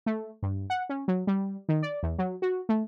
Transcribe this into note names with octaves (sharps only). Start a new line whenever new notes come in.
A3
G2
F#5
C#4
F#3
G3
D#3
D5
E2
F#3
F#4
A3